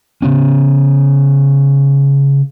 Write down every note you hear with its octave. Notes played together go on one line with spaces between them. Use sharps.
C#3 B3 C#4